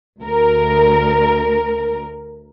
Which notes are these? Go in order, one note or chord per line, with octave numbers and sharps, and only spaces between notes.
D2 A#4